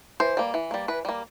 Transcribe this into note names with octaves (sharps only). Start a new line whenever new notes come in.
E3 C5
G3 A#3
E3
G3 A#3
E3 B4
G3 A#3